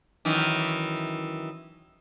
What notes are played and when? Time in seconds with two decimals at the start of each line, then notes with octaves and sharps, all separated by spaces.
0.25 F#2 D#3 E3